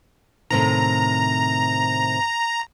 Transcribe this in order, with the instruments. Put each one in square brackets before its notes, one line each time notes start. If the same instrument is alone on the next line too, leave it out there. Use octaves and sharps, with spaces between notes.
[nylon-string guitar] A2 C3 D#3 [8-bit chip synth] A#5